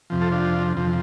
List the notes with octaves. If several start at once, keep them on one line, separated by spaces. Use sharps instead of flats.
F2 C3 F3
F4 A4
D4 F4
F2 C3 F3